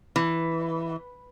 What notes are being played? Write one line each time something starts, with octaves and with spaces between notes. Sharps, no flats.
E3